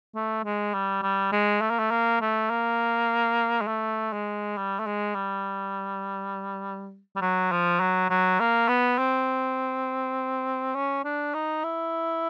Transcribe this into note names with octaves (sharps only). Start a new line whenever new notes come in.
A3
G#3
G3
G3
G#3
A3
A#3
A3
A#3
A3
A#3
G#3
A3
G#3
G3
A3
G#3
G3
G3
F#3
F3
F#3
F#3
A#3
B3
C4
C#4
D4
D#4
E4